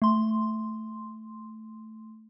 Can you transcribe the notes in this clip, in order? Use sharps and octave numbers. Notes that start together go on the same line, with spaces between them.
A3 C6